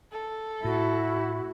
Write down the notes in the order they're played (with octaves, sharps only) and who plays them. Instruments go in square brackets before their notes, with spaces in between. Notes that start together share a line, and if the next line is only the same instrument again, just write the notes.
[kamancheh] A4
[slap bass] A2 [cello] E4 [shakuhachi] F#4